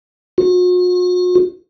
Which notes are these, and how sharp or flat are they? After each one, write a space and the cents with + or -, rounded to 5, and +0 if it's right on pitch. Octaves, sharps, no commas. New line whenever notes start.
F#4 -45